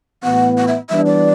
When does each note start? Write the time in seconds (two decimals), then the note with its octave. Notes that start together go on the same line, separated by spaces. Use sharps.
0.23 A2 E3 B3 F#5
0.57 F#5
0.68 E5
0.90 E3 G3 B3 D4 E5
1.06 D5